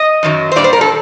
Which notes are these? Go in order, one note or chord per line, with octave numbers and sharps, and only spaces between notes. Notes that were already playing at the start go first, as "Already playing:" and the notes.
Already playing: D#5
F#2 D#3 F#3
C5
A#2 G3 D4 D5
C5
A#4
A4